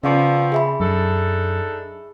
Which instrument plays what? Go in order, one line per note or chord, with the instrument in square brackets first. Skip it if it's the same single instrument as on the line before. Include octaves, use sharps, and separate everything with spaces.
[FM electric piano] C#3 [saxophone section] F3 B3 C4 [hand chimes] D5 F5 C#6
[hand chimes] G#4 E5 B5
[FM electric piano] F#2 [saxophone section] D4 D#4 A4